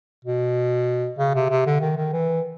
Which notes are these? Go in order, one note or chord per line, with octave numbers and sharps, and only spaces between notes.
B2
C#3
C3
C3
D3
D#3
D#3
E3